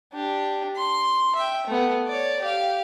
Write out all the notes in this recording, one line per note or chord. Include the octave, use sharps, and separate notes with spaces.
D4 G4
C6
E5 G5
A3 B3
C#5 D5
G4 F5